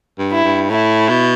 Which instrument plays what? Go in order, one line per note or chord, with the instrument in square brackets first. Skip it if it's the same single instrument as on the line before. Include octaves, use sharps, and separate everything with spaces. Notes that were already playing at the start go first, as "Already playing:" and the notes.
[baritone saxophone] G2
[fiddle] E4
[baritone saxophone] G2
[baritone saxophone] A2 [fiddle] E4
[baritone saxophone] B2